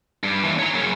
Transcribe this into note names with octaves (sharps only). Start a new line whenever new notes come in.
G2
D#2 E3
C#5 A#5
F#2 C#3